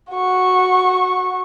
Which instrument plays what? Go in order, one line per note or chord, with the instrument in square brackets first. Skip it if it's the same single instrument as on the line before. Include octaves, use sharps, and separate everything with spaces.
[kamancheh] F#4 C#6